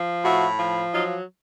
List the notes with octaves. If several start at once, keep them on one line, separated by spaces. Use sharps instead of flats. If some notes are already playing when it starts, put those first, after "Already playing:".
Already playing: F3
A2 E4 F#4
F3
F#3 D#4 F4